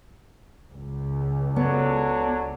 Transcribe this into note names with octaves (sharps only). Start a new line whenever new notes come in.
C#2
F#3 B3 D4 A4